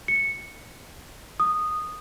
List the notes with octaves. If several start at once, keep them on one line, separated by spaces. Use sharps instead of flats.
C#7
D#6